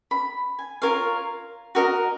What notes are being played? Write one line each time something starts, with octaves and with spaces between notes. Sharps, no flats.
B5
G#5
F4 A#4 C#5 F5
F#4 A#4 D#5